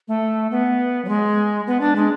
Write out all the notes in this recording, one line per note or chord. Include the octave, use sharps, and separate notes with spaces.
A3
B3
F#3
G#3
B3
D4
G#3